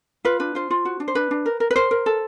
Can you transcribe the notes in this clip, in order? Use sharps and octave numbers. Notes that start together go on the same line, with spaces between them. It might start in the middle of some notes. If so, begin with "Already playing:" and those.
F4 B4
D4 B4
F4 C5
F4
F#4
D4
C5
D4 B4
D4
A#4
A#4
B4
A#4 C5
A#4
A4